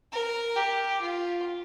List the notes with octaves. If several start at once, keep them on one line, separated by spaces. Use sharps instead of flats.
A#4
G4
F4